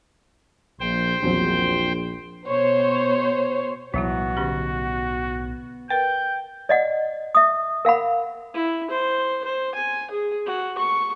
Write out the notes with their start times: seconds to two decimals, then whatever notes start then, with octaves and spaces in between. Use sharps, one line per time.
0.80 A#1 C5 G5
1.22 A#1 E2 F#3 C4
2.47 B2 C5 C#5
3.94 B1 A2 F3 G3 B3 E4 F#4
4.37 D3 C#4 G4
5.90 A#4 B4 G5 G6
6.69 D5 D#5 F#5
7.35 E5 D#6
7.85 A#4 F5 F#5 B5
8.54 E4
8.90 C5
9.44 C5
9.75 G#5
10.11 G#4
10.46 F#4
10.78 C#6